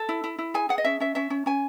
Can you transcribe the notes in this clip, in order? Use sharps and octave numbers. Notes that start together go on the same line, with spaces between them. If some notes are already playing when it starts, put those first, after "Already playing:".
Already playing: A4
E4
E4
E4
G#4 G#5
G#4 F#5
D#5
C#4 E5
C#4 E5
C#4 E5
C#4
C#4 G#5